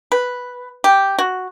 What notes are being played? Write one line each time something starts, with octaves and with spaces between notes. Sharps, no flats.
B4
G4
F#4